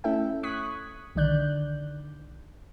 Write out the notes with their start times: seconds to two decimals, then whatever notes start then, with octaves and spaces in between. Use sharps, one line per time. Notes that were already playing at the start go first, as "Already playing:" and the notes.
0.04 A3 C#4 E4 A4 E5 G5
0.43 C#6 D#6 F#6 G#6 B6
1.15 B1 D3 D#3 D5 F#6 G6